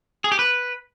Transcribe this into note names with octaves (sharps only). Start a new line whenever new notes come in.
G#4
G4
B4